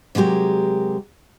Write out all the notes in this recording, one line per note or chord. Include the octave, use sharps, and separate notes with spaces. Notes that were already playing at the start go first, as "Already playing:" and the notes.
C3 F#3 G#3 G4 A#4